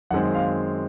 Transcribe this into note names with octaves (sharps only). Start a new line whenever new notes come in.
F#2 D#3 G#3 C4 F#5
F5